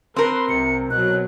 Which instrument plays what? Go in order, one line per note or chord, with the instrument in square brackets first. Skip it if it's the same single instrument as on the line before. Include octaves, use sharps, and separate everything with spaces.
[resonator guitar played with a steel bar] C4 A#4 [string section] B4 [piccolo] C6
[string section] C2 C3 [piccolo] C#7
[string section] B2 F#3 [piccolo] F#6